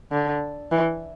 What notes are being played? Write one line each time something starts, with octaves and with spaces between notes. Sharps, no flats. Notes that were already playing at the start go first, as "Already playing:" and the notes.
D3
E3